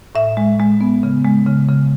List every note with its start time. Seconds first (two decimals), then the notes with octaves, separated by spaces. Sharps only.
0.15 A2 E5
0.37 G#3
0.60 G#3
0.81 B3
1.03 C#3
1.25 G#3
1.47 C#3
1.69 C#3